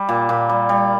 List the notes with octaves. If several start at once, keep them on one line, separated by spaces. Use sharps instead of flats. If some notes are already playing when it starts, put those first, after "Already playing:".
Already playing: G3
A#2
A#2
G3
G3